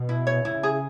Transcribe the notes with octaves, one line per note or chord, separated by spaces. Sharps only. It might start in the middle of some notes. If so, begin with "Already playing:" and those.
Already playing: B2
E4
C#5
C#3 E4
G#4